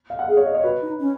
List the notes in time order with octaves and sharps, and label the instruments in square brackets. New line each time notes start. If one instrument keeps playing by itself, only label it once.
[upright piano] F5
F#5
[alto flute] G#4 [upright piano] F5
[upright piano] C#5
D#5
C#5
[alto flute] F#4 [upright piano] B4
[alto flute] D#4
C#4